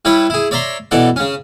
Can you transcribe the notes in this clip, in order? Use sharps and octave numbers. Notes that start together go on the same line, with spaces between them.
G3 E4 B4 C#5
E4 G#4
C#5 D5 E5 A#5 C6
B2 E3 A4 D5 F#5
C#3 C#4